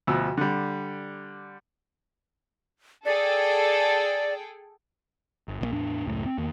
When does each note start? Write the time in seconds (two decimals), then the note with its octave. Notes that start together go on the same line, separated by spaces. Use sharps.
0.07 D2 B2 F3 E6
0.37 D3 G3
3.06 G#4 A4 D5 G5
5.48 G1
5.61 A#1 E3 A#3
5.72 E2 A2 D4
6.07 C#2 F#2 A2 A3
6.26 C4
6.38 E2 D#3 A#3